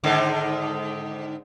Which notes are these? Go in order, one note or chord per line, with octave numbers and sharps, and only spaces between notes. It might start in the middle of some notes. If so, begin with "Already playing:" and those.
G#2 D3 D#3